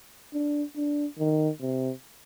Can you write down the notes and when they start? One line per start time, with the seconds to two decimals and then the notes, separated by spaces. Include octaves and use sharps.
0.33 D4
0.76 D4
1.19 D#3
1.61 C3